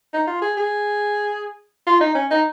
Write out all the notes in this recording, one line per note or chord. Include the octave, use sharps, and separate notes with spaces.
D#4
F4
G#4
G#4
F4
D#4
C#4
D#4